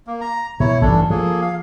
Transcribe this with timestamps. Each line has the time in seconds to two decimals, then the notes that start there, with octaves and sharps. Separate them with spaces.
0.07 A#3
0.21 A#5
0.60 B2 E4 C#5
0.82 A1 G2 D4 A4
1.10 F3 A#3 G#4 A4
1.42 F5